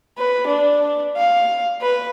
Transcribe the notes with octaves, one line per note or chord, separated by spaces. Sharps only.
B4
D4
F5
B4